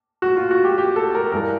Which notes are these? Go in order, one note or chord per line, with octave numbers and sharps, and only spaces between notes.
F#4
F4
F#4
G4
G4
A4
A#4
G2 E3 G#3 A#4